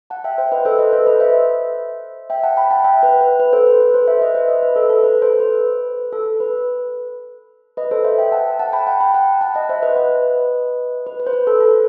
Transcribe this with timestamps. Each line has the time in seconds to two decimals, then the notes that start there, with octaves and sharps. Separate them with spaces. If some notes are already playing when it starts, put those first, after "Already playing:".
0.10 F#5 A5
0.24 E5 G5
0.38 C5 E5
0.52 B4 D#5
0.65 A4 C5
0.79 B4 D#5
0.93 A4 C5
1.07 B4 D#5
1.20 C5 E5
2.30 E5 G5
2.43 F#5 A5
2.57 G5 B5
2.71 F#5 A5
2.84 E5 G5
3.03 B4
3.21 B4
3.40 B4
3.53 A4 C5
3.67 B4
3.81 B4
3.94 A4 C5
4.08 C5 E5
4.22 B4 D#5
4.35 C5 E5
4.49 B4 D#5
4.63 B4
4.76 A4
4.90 A4
5.04 B4
5.22 A4 C5
5.40 B4
6.13 A4
6.40 B4
7.77 B4 D#5
7.91 A4 C5
8.04 C5 E5
8.18 E5 G5
8.32 F#5 A5
8.59 F#5 A5
8.73 G5 B5
8.87 F#5 A5
9.00 G5 B5
9.14 F#5 A5
9.41 F#5 A5
9.55 D#5 F#5
9.69 C5 E5
9.83 B4 D#5
9.96 B4 D#5
11.07 B4
11.20 B4
11.27 C5
11.33 B4
11.47 A4
11.61 A4